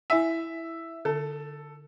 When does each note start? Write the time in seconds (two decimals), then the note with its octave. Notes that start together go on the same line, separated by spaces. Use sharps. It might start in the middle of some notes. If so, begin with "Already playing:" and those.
0.10 E4 E5 G#5
1.05 D3 A4